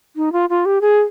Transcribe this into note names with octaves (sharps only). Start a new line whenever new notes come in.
D#4
F4
F4
G4
G#4